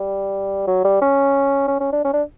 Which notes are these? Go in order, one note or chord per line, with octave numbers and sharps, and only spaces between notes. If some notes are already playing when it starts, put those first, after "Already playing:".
Already playing: G3
F#3
G3
C#4
C#4
C#4
D4
C#4
D4